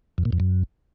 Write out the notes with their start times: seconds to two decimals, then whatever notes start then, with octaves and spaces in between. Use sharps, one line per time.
0.18 F2
0.25 A#2
0.33 F2
0.40 F#2